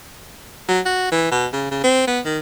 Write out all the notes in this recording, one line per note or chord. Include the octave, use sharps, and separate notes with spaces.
F#3
F#4
E3
B2
C#3
C#3
C4
B3
D#3